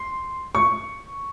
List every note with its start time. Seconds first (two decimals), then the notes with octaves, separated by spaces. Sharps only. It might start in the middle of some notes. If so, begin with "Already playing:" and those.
Already playing: C6
0.55 C#6